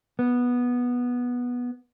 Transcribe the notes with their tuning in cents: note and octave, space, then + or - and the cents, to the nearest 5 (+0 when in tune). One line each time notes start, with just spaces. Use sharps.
B3 -10